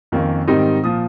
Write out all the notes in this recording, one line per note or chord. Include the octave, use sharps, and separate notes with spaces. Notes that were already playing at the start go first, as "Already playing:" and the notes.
F2 D#3 A#3 C#4
G#2 D#3 G3 C4 D#4
A#2 F3 D#6